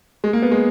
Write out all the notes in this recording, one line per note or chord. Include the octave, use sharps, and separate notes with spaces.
G#3
A#3
B3
G#3